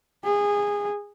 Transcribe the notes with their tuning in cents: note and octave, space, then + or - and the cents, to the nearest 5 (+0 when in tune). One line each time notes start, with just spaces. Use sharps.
G#4 -20